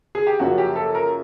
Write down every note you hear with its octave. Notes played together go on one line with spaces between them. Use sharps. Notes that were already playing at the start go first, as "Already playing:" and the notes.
G#4
G4
F#2 C#3 F3 A#3 C#4 F#4
G4
A4
A#4